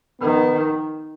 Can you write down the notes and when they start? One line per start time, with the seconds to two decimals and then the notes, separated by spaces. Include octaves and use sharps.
0.20 D#3 B3